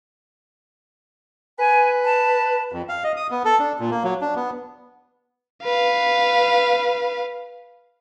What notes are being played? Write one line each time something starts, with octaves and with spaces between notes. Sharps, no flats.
B4 G#5
A5
F2
F5
D#5
D#6
B3
A4
D4
A#2
A#3
F#3
D4
B3
B4 F5